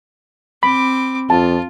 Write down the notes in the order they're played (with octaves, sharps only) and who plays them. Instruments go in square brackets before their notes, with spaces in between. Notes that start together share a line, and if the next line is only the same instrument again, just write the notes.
[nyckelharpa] C4 D6 [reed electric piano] B5
[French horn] F2 [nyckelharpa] F4 [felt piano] A5